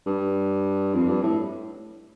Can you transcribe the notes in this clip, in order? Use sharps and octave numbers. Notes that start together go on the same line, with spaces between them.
G2
F2
G2
A2